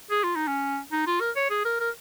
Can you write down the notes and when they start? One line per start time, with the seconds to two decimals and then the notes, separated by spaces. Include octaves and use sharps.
0.11 G#4
0.24 F4
0.36 D#4
0.48 C#4
0.92 D#4
1.07 F4
1.21 A#4
1.36 C#5
1.50 G#4
1.65 A#4
1.80 A#4